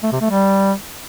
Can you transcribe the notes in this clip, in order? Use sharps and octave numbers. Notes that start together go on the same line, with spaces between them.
A3
C3
A3
G3